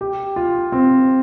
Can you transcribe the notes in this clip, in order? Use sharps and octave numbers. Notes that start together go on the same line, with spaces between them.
G4
F4
C4